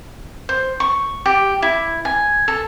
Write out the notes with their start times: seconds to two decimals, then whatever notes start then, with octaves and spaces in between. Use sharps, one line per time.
0.49 C5
0.80 C#6
1.26 G4
1.62 E4
2.05 G#5
2.48 A4